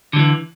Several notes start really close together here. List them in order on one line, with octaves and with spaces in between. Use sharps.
D3 F#3 E3